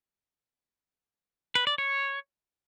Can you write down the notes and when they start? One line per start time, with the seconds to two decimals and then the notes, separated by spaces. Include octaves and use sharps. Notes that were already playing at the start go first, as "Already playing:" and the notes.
1.55 B4
1.67 D5
1.78 C#5